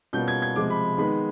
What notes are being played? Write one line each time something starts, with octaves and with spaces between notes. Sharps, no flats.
B2 G3 A#3 C#4 F4 G6
G#6
G#6
C3 F3 G#3 D6
B5
D#3 G#3 B3 D#4 B5